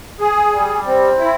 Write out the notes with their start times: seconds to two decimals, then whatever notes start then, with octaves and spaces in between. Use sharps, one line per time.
0.20 G#4
0.52 G3
0.86 C4
1.18 E4